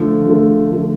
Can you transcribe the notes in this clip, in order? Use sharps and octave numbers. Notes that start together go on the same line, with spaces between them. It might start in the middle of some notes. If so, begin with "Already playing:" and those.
Already playing: D3 F3 A3
D3 F3 A3
D3 F3 A3